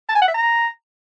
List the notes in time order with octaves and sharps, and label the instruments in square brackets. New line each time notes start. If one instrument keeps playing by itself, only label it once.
[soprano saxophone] A5
G#5
F#5
E5
A#5